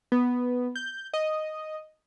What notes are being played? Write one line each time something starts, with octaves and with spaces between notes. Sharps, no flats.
B3
G6
D#5